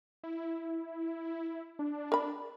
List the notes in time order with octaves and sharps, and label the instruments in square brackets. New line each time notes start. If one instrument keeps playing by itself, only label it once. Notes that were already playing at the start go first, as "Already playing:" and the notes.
[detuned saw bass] E4
D4
[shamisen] A#4 B5